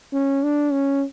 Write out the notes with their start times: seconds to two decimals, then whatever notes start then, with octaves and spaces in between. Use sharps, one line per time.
0.13 C#4
0.44 D4
0.72 C#4